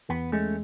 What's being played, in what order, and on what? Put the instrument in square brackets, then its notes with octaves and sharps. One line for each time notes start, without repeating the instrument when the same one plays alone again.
[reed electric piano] E2 [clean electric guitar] B3
[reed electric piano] G#3 [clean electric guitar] A3 C#4